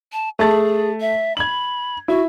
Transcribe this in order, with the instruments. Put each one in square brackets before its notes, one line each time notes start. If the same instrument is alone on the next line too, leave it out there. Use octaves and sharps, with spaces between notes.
[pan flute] A5
[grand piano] A3 A5 A6 [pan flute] G#4
[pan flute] E5
[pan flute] B5 [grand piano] G#6 F#7
[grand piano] E4 [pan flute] F#4